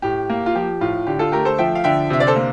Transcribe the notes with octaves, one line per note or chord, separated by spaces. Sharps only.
A2 G4
A#3
F4
F3 G4
A2 F4
D3 G4
F4 A4
A3 G4 A#4
A4 C5
F3 E5 G5
F5
D3 E5 G5
C3 E5
D5
A4 C5
A#3